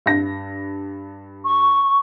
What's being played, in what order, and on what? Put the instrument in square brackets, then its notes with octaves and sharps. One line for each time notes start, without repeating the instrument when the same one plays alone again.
[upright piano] G2 A#6
[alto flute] C#6